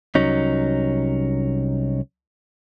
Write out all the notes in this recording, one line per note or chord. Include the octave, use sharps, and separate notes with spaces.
C2 F#3 C#4 D#4